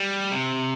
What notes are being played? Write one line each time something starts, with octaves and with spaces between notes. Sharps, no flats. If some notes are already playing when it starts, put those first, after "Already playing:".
Already playing: G3
C3